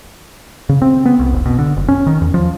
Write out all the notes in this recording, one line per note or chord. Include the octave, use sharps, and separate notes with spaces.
C#3
C4
B3
C2
F1
B2
D3
F#1
C#4
D#3
E2
F3